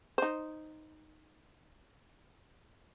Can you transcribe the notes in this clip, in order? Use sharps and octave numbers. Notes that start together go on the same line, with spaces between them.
D#4 C5